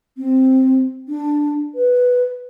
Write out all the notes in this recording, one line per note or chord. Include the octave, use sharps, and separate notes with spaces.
C4
D4
B4